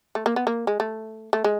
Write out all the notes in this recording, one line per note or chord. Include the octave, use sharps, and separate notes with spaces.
A3
A#3
B3
A#3
G#3
A3
A3
G#3